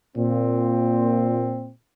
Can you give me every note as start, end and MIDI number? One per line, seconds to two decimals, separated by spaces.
0.16 1.71 46
0.16 1.71 60